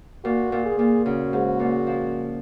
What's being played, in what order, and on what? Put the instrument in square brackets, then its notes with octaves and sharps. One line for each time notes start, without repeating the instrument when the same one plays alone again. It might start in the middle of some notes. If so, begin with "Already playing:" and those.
[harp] A#2 [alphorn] F#4
[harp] A#2
[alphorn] G#4
[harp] A#2
[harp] C#3 [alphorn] F#4
[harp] G#2
A#2
F3